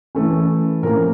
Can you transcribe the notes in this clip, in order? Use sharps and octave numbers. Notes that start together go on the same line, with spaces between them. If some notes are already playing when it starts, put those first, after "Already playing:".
E3 A3 C#4
A2 F3 A#3 C#4 A#4